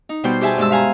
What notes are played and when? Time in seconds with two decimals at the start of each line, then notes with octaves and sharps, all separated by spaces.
0.09 D#4
0.24 B2 G3 C5 G5 C6
0.41 G4 G#4 E5 G#5 A5
0.58 G2 G#3 A5 E6
0.70 E5 F5 G#5 A#5